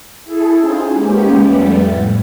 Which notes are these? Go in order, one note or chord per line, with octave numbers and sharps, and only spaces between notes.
E4 G#4 A4
C4 C#4 D#4 F4 G#4 C5
G#3 A#3 B3 C#4 G4
F2 G3 A3 B3
A2